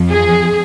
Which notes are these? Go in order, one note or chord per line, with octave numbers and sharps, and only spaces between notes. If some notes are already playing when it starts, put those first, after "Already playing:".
Already playing: F2 F3
G#4